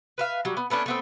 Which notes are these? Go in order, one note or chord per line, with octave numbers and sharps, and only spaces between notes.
B4 E5 F5
F#3 G3
B3
A3 B3 C#4 D4
A3 B3 C4